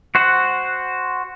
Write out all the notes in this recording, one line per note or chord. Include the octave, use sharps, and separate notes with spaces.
F#4 C5 F#5